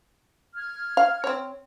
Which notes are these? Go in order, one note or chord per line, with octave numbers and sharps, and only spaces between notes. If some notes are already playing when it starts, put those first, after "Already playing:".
F6 G#6
F5
C4 C#5